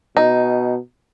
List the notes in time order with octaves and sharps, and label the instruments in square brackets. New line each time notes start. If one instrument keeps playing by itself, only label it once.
[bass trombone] B2 [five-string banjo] D#4